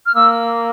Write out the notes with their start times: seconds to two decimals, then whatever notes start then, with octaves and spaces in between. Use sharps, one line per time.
0.06 F6
0.15 A#3 E6